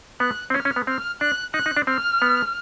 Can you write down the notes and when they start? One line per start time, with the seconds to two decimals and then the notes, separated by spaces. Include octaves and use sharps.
0.20 B3 F#6
0.50 C4
0.54 C#4 F6
0.65 C#4
0.76 B3
0.87 C4 F6
1.21 D4 F#6
1.54 D#4 F#6
1.66 D#4
1.77 D4
1.87 C4 F6
2.22 B3